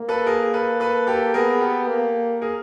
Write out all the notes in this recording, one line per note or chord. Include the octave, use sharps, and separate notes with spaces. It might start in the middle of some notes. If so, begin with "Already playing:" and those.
Already playing: A#3
A4 B4
G#4 A#4
A4 B4
A4 B4
G4 A4
B3 G#4 A#4
G4 A4
A#3
G#4 A#4